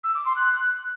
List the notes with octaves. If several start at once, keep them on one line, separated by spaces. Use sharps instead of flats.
E6
D6
C6
F#6